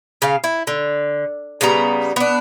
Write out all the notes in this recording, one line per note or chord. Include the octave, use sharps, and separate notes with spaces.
C#3 F5
E4
D3
C#3 G3 B3 A#5
B3 D4